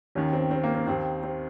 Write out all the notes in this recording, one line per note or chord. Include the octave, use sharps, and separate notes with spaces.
D#2 D#3 C#4
C4
C4
A#3
C4
D#2 D#3 C4
C4